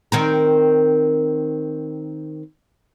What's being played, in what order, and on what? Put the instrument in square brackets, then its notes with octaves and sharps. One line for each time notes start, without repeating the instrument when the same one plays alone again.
[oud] D#3 C4 A#4